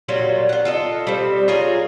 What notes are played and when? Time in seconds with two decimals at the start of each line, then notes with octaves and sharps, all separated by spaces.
0.08 A#2 F#3 G3 F4
0.49 F4 F#5
0.65 F4 A4 D#5
1.07 G3 C4
1.48 F4 G#4 A#4 C#5